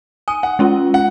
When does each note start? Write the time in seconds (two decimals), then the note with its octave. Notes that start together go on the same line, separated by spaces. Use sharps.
0.28 G#5 D#6
0.43 F#5
0.59 G#3 C#4 F4
0.94 F#5